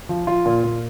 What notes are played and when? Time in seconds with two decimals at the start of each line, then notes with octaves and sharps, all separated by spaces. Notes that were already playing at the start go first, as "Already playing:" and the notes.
0.09 F3
0.27 F3 F4
0.46 A#2
0.64 A#2